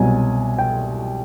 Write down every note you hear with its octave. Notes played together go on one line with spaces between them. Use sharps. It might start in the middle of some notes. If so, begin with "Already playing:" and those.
Already playing: C2 B2 F#3 G#5
G5